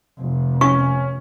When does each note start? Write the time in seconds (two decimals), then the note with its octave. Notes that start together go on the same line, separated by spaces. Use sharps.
0.20 F1
0.61 C#4 C#6